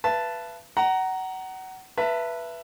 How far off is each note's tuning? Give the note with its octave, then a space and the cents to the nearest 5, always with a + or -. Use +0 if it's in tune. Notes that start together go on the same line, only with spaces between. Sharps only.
B4 +0 E5 +45 A5 +0
F#5 +25 A#5 +0
B4 -10 E5 +20 A5 +30